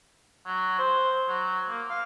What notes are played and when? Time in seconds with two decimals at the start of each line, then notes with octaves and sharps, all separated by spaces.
0.46 F#3
0.78 C5
1.28 F#3
1.68 A#3
1.90 F5